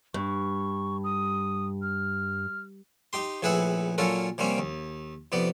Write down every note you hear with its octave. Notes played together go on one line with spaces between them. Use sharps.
G2 C#6
D#6
F6
D#4 G4 C6
A#1 A2 G#4 B4 E5 F#5
A#2 F#3 C#4 F4 A4 A#4
C3 G3 A#3 C4 C#4
D#2
F2 C3 B3 D5